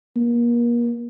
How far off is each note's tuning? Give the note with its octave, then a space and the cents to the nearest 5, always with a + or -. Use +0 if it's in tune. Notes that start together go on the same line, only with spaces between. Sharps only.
A#3 +35